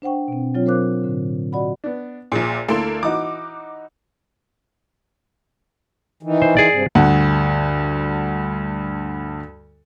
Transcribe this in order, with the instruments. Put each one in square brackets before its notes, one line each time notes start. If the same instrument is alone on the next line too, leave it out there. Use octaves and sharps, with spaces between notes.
[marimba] D4 C5 F#5 G5 C#6
B2 C4
F#3 C4 F4 C#5
A#4 C5 F5 D6 F#6
A2 D3
F#4 D5 D#5 F#5 B5
[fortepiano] B3 D4
[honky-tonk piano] A#1 A#2 [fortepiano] G#4
[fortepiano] D2 E4 C6 [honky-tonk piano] A#3 A4
[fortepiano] E3 D#4 F#4 [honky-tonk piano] D6
[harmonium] D#3 E3
[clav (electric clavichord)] C5
G#4 D5
[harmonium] G2 C3
[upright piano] D2 G2 F#5